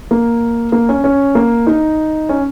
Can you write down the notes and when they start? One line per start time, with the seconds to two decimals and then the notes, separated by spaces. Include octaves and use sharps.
0.11 A#3
0.72 A#3
0.89 C#4
1.04 C#4
1.35 A#3
1.67 D#4
2.29 C#4